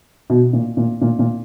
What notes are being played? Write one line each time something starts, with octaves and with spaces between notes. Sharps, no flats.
B2
A#2
A#2
A#2
A#2